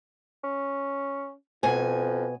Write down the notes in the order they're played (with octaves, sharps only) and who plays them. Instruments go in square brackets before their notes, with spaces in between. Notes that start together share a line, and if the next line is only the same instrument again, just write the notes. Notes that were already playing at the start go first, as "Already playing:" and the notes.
[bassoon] C#4
[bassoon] F2 [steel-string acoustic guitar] B2 G#5